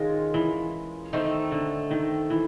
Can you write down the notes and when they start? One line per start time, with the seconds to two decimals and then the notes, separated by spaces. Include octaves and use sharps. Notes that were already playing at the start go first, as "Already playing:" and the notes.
Already playing: D#3 G#3 C#4 F4 A#4
0.34 E3
1.13 D#3 A3 C4 D#4
1.52 D3
1.91 D#3
2.30 E3